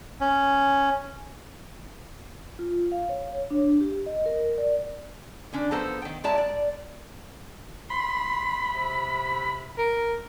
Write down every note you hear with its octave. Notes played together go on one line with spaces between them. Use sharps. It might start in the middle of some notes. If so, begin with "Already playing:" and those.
C#4
F4
F5
C#5
D4
G4
D#5
A#4
D5
D3 C#4 D4
F3 B3 A4 C5 A#5
D#3 G5
G#3 E4 D5 E5 A5 A#5
D5
B5 C6
C3
A#4